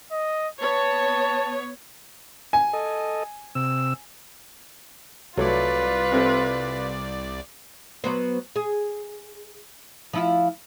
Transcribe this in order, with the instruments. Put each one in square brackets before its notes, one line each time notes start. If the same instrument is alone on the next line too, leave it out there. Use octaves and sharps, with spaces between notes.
[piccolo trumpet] D#5
[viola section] B3 C#5 [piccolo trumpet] A5
[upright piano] G#5
[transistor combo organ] A4 D#5
C3 E6
[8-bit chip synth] C2 D5 [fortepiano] F#3 A3 C#5 [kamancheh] F4 B4
[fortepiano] C3 C4 A4
[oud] F#3 B3 C5
G#4
F3 E4 F4